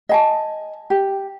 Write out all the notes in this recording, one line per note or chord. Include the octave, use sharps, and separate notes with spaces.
D#5 G#5 A5
G4